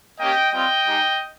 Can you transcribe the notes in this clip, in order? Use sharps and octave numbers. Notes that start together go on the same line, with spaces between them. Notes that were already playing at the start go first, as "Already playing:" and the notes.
A#3 C#4 G4 D#5 G5
G3 C4 F4 D#5 G5
G#3 D#4 G4